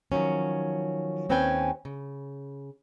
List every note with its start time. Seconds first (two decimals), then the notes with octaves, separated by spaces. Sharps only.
0.12 D#3 F3 F#3 C#4
1.29 D#2 C4 C#4 B4 G5 G#5
1.85 C#3